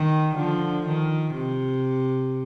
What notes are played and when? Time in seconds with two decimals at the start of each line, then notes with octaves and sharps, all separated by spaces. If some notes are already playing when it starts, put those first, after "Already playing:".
Already playing: D#3
0.35 D3 F3
0.86 D#3
1.35 C3